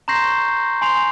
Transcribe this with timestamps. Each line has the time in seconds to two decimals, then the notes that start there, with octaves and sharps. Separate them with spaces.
0.08 A#5 C6 C#6 G6 A#6 C7
0.24 C#6
0.82 G#5 C6 C7 F7